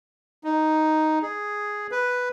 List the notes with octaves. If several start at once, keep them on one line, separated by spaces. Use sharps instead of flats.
D#4
G#4
B4